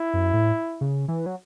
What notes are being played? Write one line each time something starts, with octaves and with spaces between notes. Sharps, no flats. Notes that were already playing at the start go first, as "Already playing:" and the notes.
Already playing: E4
F#2
A2
C#3
E3
F#3